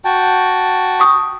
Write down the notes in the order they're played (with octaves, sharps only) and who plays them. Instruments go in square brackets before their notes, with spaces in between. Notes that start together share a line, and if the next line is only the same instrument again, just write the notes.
[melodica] F#4 G5 A5
[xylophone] C#6 D#6